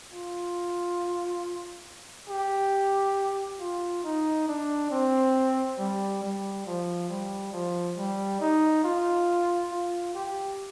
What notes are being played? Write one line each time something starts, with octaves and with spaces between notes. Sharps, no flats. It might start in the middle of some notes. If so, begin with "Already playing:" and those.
F4
G4
F4
D#4
D4
C4
G3
G3
F3
G3
F3
G3
D#4
F4
F4
G4